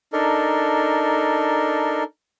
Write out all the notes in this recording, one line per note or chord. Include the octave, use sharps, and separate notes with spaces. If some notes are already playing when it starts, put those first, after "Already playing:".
D4 D#4 A4 A#4